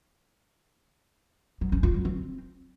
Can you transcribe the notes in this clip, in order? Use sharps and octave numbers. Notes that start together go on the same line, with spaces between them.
F#3
C#4
F4
F#3
C4